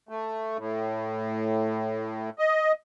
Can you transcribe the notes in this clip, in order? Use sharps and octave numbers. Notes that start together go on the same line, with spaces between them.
A3
A2
D#5